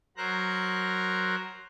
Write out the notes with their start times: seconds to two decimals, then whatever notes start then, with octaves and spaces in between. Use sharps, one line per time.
0.17 F#3 A#4 C5 A#5 F#6